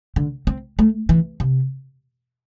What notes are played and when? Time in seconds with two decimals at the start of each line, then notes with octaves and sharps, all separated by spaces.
0.16 D3
0.47 C4
0.79 A3
1.09 E3
1.40 C3